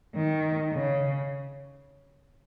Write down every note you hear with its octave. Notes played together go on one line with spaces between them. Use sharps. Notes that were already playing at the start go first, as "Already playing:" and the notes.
D#3
C#3